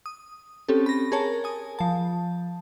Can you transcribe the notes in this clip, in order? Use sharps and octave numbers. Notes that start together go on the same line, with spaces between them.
D#6
C4 C#4 G4 A4
B5 A#6
G#4 A#4 C#5 A5
G#5 D#6
F3 A5